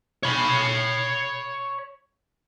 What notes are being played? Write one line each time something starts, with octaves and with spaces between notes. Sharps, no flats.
C#5 B5